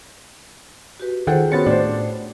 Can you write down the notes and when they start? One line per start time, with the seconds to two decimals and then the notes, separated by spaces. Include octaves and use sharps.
1.00 F#4 G4 B4
1.27 D#3 F4 G#4 A4 C5 F#5 G5
1.52 B3 C#4 F#4 C5 A6 C#7
1.66 A2 D4 C5